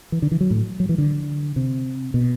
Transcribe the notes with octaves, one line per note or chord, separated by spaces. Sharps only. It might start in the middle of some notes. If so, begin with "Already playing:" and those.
E3
D3
E3
F#3
A2
F#3
E3
D3
C3
B2